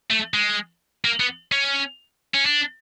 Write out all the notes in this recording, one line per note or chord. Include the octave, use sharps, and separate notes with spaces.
A3
G#3
A#3
B3
C#4
C#4
D4